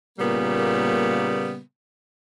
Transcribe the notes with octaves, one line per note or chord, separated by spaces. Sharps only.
A#2 C#3 G3 A#3 B3